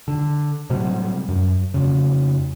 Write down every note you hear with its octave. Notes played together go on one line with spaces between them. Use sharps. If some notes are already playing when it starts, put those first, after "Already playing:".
D3
A2 C3 F#3 G3
F#2
F2 C#3